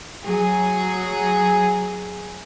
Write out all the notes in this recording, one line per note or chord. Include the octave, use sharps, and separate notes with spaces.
F#3 G#4